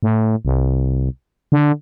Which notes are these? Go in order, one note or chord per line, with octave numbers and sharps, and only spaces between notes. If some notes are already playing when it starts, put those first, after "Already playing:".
A2
C2
D3